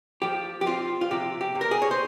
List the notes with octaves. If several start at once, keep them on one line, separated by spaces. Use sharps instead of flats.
F3 G4
G4
C4 F4
F4
C3 G4
G4
C3
A#4
G#4
C#5
C5